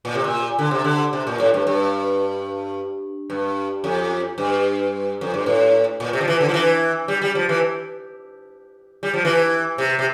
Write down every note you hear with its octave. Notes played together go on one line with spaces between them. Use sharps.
A#2
C3
A#2
D3
C3
D3
C3
A#2
A2
G2
G2
G2
F2
G2
F2
G2
A2
A#2
C3
F3
E3
D3
F3
E3
G3
G3
F3
E3
G3
F3
E3
C3
C3